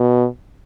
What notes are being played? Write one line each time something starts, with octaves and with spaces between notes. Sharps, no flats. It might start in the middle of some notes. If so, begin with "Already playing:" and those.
Already playing: B2